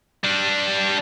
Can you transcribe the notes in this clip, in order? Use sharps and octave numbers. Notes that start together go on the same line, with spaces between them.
G3 D4